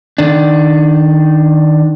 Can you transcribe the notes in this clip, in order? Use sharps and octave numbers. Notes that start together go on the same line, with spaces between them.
D#3 D4